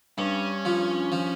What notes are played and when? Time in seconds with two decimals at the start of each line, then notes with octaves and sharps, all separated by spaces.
0.18 G2 C#4
0.65 F3
1.12 F3